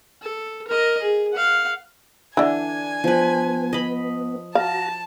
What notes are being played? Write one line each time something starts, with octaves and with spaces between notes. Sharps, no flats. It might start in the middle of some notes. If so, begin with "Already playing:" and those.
A4
A#4 D#5
G#4
F5 F#5
D3 E3 D4 G#5
F3 B3 B4
D#5 B5
F#4 F5 A5 A#5